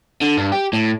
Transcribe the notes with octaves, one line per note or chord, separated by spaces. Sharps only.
D3
G2
G4
A2